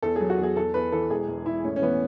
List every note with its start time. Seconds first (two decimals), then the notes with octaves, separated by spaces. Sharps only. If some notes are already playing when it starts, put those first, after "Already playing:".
0.02 E2 A4
0.16 F#3 G#4
0.30 F#4
0.38 E2 G#4
0.56 E2 A4
0.74 E2 B4
0.92 E3 A4
1.10 E1 G#4
1.28 E1
1.46 E1 E4
1.64 A2 C#4
1.76 C#4
1.82 E3 B3